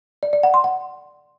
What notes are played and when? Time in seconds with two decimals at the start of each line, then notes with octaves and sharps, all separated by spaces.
0.23 D5
0.33 D5
0.43 F#5
0.54 C6
0.64 F#5